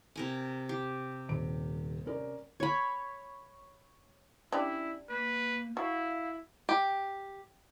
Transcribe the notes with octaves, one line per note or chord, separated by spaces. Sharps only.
C3 A#4 G#5
G4
D#1 D7
C#4 A#4 D5
C#5 B5
C#4 D4 E4 G4 D5
A#3 B4
E4 F#4 F5
G4